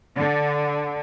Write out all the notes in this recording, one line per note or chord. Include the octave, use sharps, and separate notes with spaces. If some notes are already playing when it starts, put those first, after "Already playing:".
D3